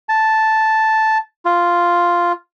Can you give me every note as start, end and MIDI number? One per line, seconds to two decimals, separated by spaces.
0.09 1.18 81
1.45 2.32 65